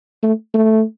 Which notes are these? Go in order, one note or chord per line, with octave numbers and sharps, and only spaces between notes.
A3
A3